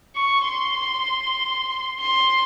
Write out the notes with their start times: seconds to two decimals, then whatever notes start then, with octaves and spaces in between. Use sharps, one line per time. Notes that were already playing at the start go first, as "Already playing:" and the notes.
0.16 C#6
0.47 C6
2.00 C6